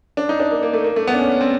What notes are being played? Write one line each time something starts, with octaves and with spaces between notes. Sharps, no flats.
D4
D#4
D4
A#3
A#3
A3
A#3
A3
B3
D4
C#4
C4